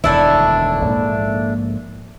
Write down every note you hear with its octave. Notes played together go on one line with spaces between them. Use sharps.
E1 D2 D#3 A3 D4 E4
A#1 G#2 A#3